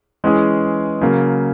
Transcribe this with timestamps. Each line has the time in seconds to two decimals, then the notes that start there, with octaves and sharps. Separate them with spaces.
0.24 E3 G#3 C#4 G#4
1.01 C#3 F#3 A#3